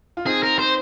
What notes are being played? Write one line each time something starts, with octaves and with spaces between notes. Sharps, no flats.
F4
C4 D#4 G#4
A#4
C5